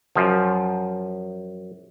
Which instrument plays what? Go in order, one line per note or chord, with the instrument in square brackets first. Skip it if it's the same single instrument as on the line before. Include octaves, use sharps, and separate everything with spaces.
[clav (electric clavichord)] F#2 F3